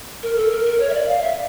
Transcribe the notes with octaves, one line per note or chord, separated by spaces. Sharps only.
A#4
A4
A#4
A#4
C#5
E5
D5
F5
E5